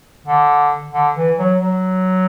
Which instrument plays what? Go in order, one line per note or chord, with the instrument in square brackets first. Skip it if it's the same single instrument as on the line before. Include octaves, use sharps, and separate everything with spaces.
[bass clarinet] D3
D3
E3
F#3
F#3